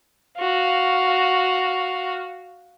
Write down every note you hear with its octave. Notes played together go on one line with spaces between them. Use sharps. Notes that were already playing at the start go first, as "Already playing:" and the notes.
F#4 F5